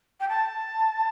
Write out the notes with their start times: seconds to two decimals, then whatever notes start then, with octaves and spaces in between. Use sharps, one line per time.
0.20 G5
0.29 A5